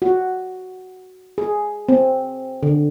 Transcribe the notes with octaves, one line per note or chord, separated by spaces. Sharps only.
F#4
G#4
C4
D3